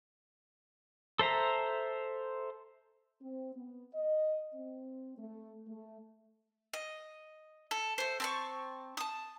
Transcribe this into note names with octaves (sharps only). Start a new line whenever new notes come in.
A4 C5 E5 A#5
C4
B3
D#5
C4
A3
A3
D#5
A4
A3 C5
C4 A5 C#6
A5 D#6